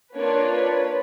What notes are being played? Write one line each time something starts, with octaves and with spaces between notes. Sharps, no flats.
A#3 D4 F4 B4 C#5
B4 C#5